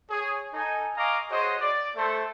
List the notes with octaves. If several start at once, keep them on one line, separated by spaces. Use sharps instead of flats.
G#4 C#5
D#4 A4 G#5
D#5 F5 G#5 A#5 C#6 D6
F#4 G#4 C5 C#5 D#5
D5
A3 A4 C5